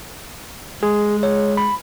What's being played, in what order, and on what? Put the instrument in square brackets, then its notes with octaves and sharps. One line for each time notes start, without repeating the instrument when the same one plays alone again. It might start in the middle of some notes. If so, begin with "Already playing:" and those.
[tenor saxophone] G#3 [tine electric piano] G#4
[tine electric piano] C#5
B5